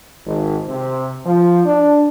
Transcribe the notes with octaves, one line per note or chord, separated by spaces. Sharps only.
G#1
C3
F3
D4